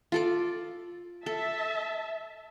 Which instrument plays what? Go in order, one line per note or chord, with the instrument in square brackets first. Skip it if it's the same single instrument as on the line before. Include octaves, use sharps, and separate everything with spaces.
[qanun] F4 A4 D5
[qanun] A4 [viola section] E5 A5